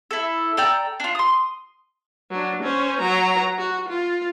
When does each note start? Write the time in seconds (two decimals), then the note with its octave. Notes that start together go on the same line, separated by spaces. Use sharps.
0.11 E4 A4
0.57 A4 D5 G5 A#5
1.00 D4 F4
1.15 C6 D#6
2.31 F#3 D4
2.63 C#4 C5
3.00 F#3 A#5
3.58 F#4
3.88 F4